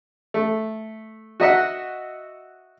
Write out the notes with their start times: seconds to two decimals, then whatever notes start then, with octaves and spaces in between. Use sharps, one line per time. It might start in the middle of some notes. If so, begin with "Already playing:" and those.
0.34 A3
1.40 F#4 D#5 E5 F#5